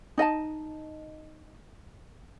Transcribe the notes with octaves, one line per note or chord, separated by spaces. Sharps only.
D#4 D#5 F5 A5